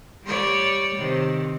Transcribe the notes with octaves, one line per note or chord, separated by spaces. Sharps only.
G3 C#5 D5
C3 D#3